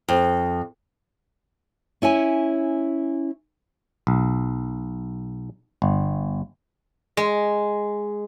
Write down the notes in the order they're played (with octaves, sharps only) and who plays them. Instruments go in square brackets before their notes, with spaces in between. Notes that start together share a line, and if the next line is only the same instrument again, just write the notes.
[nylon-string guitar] F2
C#4 E4 C#5 G#5
[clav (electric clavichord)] B1
G1
[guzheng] G#3